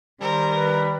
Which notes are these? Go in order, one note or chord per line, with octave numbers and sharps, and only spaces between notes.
D#3 G3 A#4 C5
B4